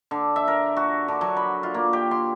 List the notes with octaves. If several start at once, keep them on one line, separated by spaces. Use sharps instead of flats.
D3
E5
A#4
F#4
D3
F#3
B5
F4
A#3
G4
C6